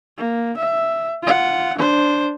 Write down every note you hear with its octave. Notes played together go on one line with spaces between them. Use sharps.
A#3
E5
F4 F#5
D4 C5